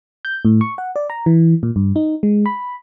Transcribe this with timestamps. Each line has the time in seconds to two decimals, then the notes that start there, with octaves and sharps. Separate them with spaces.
0.25 G6
0.45 A2
0.61 C#6
0.78 F#5
0.96 D5
1.10 A#5
1.26 E3
1.63 A#2
1.76 G2
1.96 D#4
2.23 G#3
2.46 B5